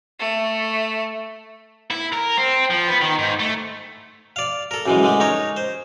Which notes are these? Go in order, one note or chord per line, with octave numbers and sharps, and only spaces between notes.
A3
E4
A#4
C4
F3
B3
D#3
G#2
A3
D5 F5
A4 A#4
F#2 E3 G#3
D3 G#3 A3
D#4 A#4 C#5
C5